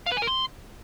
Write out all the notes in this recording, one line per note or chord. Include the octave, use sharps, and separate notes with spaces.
F5
B4
G#5
A#4
C6